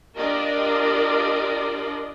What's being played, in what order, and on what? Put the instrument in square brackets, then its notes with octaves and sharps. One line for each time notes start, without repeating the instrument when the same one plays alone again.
[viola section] D4 F4 G4 A#4 D5 D#5